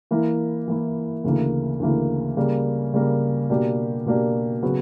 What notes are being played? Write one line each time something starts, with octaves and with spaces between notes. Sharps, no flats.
E3 A#3 E4
E3 A#3 E4
D2 C#3 E3 A#3
D2 C#3 E3 A#3
C#3 G3 A#3
C#3 G3 A#3
B2 A#3 D4 G4
B2 A#3 D4 G4
C#3 F#3 B3